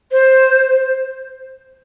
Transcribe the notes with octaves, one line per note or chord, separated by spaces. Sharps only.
C5